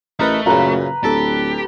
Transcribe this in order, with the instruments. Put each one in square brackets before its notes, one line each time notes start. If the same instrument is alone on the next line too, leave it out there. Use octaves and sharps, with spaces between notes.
[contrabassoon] A1 [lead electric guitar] A3 [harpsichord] D#4 A#4 B4
[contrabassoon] F#2 [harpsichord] A#2 C#3 [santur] B4 A#5
[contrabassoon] D1 [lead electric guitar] G4 [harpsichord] A4 A5